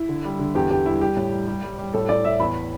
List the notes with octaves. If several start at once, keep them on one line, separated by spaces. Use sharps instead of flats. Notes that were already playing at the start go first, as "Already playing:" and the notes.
Already playing: E4
D3
G3
D3
E2 G4
E2 G4
G3 E4
G3 G4
A2
G3
G3
G3
G3
A2 A4
A2 D5
A2 E5
E2 B5